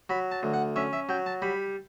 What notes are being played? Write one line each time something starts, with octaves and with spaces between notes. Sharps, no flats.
F#3 B5
A5
D2
F#5
C#4 E5
E5
F#3 G5
A5
G3 B5